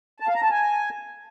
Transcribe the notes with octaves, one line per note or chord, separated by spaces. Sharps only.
A5
F5
A#5
A5
G#5